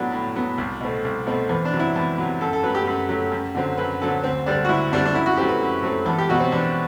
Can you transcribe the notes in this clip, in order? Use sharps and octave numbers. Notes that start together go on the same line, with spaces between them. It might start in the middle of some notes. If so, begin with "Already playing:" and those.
Already playing: A2 F#3 B3 D4
A2
F#3 B3
C2
B2 A3 C4
C2
B2 A3 C4
E2 C4
D4
C3 F#3
E4
E2
C3 F#3
F#2 A4
A4
F#3 A3 B4
G4
F#2
F#3 A3
F#2
D3 F#3 C4
F#2 B4
D3 F#3 C4 A4
D2 C4
D3 G3 C4 D4
F#4
D2 E4
D3 G3 C4 D4
D4
F#2 E4
F#4
F#3 A3 C4 G4
B4
F#2
F#3 A3 C4
E2 A4
G4
B2 F#3 F#4
C4
E2 D4